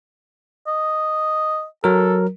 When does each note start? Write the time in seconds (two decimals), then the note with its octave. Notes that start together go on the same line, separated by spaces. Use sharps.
0.67 D#5
1.84 F#3 A4 A#4